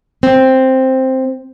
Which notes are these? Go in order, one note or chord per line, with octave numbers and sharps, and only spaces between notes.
C4